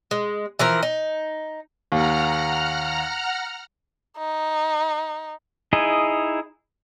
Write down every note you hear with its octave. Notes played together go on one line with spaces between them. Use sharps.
G#3
E3 F3 A#4
D#4
D#2 F#5 A#5 F6
D#4
D#4 E4 G#4 D#5